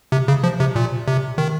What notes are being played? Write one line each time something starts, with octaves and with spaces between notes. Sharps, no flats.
C3
C#3
F3
C3
A#2
C3
D#3